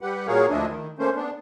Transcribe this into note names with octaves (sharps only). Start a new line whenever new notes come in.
G3 G4 B4 F#5
A#2 F#4 G#4 A#4 C#5 F5
D2 F3 D4 E4 D#5
D#3
A3 A#3 C#4 C5
B3 D4